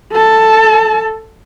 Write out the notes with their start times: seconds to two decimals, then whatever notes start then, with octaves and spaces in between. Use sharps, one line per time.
0.12 A4 A5